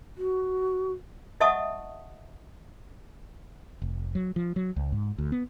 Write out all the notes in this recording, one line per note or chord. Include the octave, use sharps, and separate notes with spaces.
F#4
D#5 E5 F#5 A5 C#6 D#6
F1
F#3
F3
F#3
C#2
G#2
D2
B3